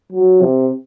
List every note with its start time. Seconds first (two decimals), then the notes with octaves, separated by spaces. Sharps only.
0.12 F#3
0.41 C3